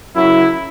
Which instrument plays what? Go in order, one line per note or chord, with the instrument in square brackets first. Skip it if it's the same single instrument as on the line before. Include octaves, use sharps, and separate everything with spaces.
[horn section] F#2 C#3 F#3 E4